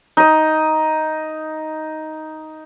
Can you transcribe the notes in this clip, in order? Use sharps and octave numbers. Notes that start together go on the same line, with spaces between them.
D#4 D#5